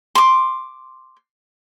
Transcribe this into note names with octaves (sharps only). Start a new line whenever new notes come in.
C6 D6